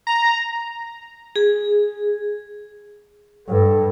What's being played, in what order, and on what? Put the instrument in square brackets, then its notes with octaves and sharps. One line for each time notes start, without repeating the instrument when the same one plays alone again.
[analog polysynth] A#5
[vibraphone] G#4
[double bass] G2 [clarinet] A4